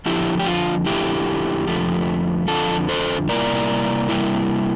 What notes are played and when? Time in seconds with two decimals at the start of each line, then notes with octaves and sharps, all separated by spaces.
0.06 F2 D3 F3 E4 G4
0.39 G4
0.46 F4
0.86 F2 D3 F3 A3 E4 G4
1.67 F2 D3 F3 A3
2.48 F2 D3 F3 F4 A4
2.89 A4 C5
3.29 C3 G3 A#3 E4 A#4 D5
4.09 C3 G3 A#3 E4